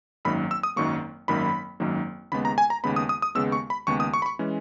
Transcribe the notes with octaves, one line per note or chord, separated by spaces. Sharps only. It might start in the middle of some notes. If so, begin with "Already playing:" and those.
G#1 F#2 D#3 F#3 A#3 B5
E6
D#6
G#1 F#2 D#3 F#3 A#3 C#6
G#1 F#2 D#3 F#3 A#3 B5
G#1 F#2 D#3 F#3 A#3
D#2 C#3 G#3 B3 B5
A#5
G#5
A#5
D#2 C#3 G#3 B3 B5
D#6
D#6
D#6
D#2 C#3 G#3 B3 E6
C#6
B5
D#2 C#3 G#3 B3 C#6
D#6
C#6
B5
C#6
E3 G#3 C#4